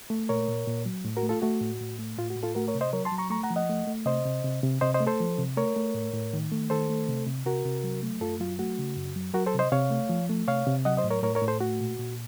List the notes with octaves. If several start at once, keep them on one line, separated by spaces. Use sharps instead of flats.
A3
A#2 A#4 C#5
A#2
A#2
F#3
A2
F#4 A#4
A3
F4 A4
A3 F#4
A2
A2
A3
A2 F4
F#4
A2
F4 A4
A3 F#4 A#4
A#4 C#5
C3
C5 D#5
F#3 A#4 C#5
A5 C6
F#3
A#5 C#6
A3 A#5 C#6
F#5 A#5
F3
D#5 F#5
A3
A3
C3 C5 D#5
C3
C3
C3
C3 C5 D#5
C5 D#5
A3
A4 C5
F3
C3
A3 A#4 C#5
A3
A2
A2
D#3
A3
D#3 A4 C5
A3
C3
C3
C3 F#4 A#4
C3
F#3
A3
F#2 F4 A4
F#3 F4
A3 F#4
C#3
F#2
F#3
F#3 F#4 A#4
A4 C5
C3
C5 D#5
C3 C#5 F5
A3
F3
A3
C3 C#5 F5
C3
F#3 D#5 F#5
C5 D#5
A2
A#4 C#5
A2 A#4 C#5
A#4 C#5
A2
A4 C5
A3 F#4
A#2
A#2